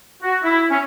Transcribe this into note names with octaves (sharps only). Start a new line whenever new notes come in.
F#4
E4
C#4